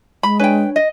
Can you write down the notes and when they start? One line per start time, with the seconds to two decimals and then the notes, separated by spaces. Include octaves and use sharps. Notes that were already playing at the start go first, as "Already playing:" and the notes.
0.23 G#3 B5
0.39 D4 B4 C#5 G5 G#5
0.76 D#5